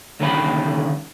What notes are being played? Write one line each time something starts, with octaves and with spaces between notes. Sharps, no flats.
C2 D3 D#3 C#4 G4 B5